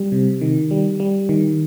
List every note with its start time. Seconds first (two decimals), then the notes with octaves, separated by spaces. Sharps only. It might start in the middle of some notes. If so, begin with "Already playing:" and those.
Already playing: G3
0.12 C3
0.41 D#3
0.71 G3
1.00 G3
1.29 D#3